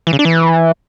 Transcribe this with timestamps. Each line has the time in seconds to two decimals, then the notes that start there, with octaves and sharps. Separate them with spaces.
0.07 E3
0.13 C#3
0.19 D4
0.25 E3